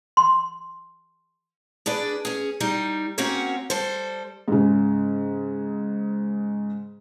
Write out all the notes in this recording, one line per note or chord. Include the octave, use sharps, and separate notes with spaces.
C6
D4 G#4 B4 D5
C#4 G#4
G3 D#4
A#3 C4 C#4 F#4 C#5 F#5
G3 A4 C5
G#2 C#3